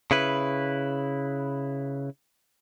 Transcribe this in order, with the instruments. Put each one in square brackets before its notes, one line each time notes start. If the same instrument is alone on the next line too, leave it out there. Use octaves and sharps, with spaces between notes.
[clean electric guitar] C#3 E4 B4